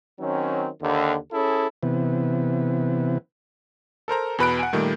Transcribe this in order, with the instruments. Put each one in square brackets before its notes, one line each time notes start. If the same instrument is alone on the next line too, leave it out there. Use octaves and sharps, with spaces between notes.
[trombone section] D#3 F#3 C4 C#4
D#2 D3
C#4 E4 G#4 A4
[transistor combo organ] C3 E3 B3
[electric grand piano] A4 A#4 C5 A#5
E2 B2 B4 B5 F#6 D7
F#5 G#5
A#2 D#3 G3 A3